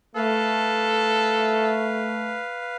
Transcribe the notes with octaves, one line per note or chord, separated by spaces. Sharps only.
A3 A4 B4 F5